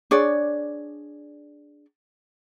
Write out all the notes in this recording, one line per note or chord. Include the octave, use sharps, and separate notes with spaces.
D4 G#4 C#5 D5